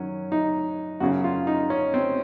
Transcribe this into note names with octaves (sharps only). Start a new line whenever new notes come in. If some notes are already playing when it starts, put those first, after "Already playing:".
Already playing: F#2 D#3 F#3 C#4
D#4
F#2 C#3 F#3 F#4
F4
D#4
C#4
C4